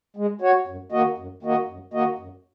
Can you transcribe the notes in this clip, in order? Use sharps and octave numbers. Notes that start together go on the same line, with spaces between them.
G#3
F#4 C#5
F#2
D#3 A#3 F#4 D#5
F#2
D#3 A#3 F#4 D#5
F#2
D#3 A#3 F#4 D#5
F#2